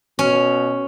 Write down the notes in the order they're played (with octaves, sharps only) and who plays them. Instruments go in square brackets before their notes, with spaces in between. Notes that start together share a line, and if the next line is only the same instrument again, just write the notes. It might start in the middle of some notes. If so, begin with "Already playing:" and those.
[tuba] B2 [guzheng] C#4